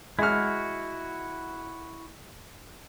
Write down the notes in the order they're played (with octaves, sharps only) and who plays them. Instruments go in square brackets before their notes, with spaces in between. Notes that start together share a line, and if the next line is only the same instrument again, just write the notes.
[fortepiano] G#3 F6 [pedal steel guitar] E4 F#4